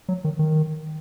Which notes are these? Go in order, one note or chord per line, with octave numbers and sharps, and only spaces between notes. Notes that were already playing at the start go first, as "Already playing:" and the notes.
F#3
D#3
D#3